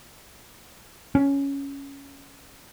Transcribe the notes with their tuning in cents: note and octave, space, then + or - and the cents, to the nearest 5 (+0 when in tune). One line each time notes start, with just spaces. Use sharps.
C#4 +5